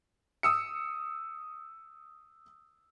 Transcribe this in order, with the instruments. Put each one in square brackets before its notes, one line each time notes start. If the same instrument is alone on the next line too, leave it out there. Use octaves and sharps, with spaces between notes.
[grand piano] D#6 E6 C#7